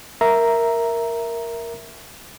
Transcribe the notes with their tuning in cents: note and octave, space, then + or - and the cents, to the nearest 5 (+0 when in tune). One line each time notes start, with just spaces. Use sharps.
A#4 +0 E5 +0 A#5 +0